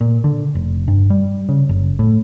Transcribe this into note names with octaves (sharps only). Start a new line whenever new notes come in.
A#2
D3
F1
G2
G3
C#3
F#1
A2